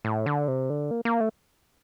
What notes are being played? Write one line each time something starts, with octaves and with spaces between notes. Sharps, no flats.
A2
D3
C3
D3
A#3
A#3
A3